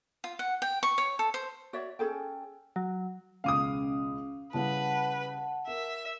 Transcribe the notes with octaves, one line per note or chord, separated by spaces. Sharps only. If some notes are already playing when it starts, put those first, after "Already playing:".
F4
F#5
G5
C#6
C#5
A4
C5
F#4 C#5 D5 E5
C#4 G#4 A4 G5
F#3
E1 C#2 C#4 F5 D6 D#6 D#7
C#3 G3 E4 B4 F#5 A5
A#4 E5